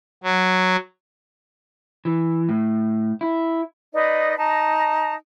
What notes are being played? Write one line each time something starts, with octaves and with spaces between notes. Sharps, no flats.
F#3
E3
A2
E4
D#4 B4 D5 D#5
D#4 A5 A#5